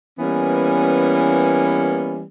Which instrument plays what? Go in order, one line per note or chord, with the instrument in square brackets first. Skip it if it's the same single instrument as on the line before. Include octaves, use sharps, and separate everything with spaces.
[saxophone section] E3 G3 A#3 B3 C#4